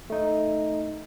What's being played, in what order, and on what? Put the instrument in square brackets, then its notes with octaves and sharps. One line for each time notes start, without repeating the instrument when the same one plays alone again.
[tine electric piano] A3 D#4